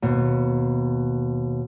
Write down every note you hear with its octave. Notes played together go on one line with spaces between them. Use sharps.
D#2 B2